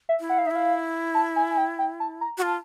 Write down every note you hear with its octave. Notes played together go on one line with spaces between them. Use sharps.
E5
E4
F#5
F5
D#4 E5
E4 F5
A5
G#5
G#5
G5
G5
A5
A#5
F#4
F4 A5